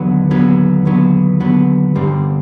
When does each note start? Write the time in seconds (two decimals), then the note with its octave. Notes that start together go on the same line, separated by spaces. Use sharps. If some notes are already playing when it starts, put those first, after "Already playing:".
Already playing: D#2 D3 F#3 B3
0.31 D#2 D3 F#3 B3
0.85 D#2 D3 F#3 B3
1.40 D#2 D3 F#3 B3
1.96 G2 D3 G3 C4